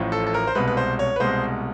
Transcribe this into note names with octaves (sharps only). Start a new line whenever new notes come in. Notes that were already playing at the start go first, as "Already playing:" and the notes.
Already playing: A1 A2 F3
A4
A4
A#4
C5
C2 B2 G#3 B4
B4
C5
C#5
B4
C2 B2 G#3 C5